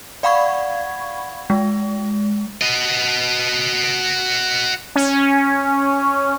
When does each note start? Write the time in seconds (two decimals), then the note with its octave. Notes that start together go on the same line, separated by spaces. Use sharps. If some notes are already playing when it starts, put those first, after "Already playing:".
0.23 D5 F5 F#5 B5 C#6 G#6
1.50 G#3
2.62 F#4 D#5
4.95 C#4